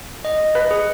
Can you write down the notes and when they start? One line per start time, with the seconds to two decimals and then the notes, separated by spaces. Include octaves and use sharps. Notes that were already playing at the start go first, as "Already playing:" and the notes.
0.25 D#5
0.55 B4
0.71 G#4